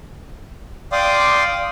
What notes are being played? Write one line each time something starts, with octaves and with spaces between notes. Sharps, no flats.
D5 F5 G5 C6 D6 D#6